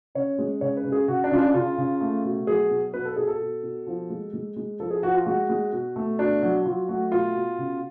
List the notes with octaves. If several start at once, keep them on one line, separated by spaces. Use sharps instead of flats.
C#3 C#5
G#3
C#3 C#5
B4
C#3
G#4
C#3 F#4
D4
C#3 F4
D4
D4
C#3 F4
C#3
A3
B2
F#3 G#4
B2
B2 B4
A4
B2 G#4
A4
B2
B2
F3
G#3
G#3
G#3
F3 A4
G#4
F3 F#4
F4
G#3 F#4
G#3
B2
A3
B2 D4
F#3
F#3 F4
A3 F#4
B2 F4
B2
C#3